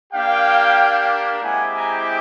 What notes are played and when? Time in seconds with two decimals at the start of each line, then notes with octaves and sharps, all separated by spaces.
0.13 A#3 D4 G4 F5 G5
1.42 G#3 C4 E4 G4 F#5 G#5
1.75 G#5 A#5